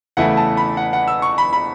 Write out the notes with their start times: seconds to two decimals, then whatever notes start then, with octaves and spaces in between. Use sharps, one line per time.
0.17 E2 C#3 A3 E4 F#5
0.37 A5
0.57 B5
0.77 F#5
0.93 F#5
1.07 E6
1.22 C#6
1.38 B5
1.53 B5